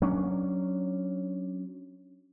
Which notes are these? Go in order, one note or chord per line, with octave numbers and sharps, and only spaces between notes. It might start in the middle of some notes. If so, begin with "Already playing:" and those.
F#3 C#4 D4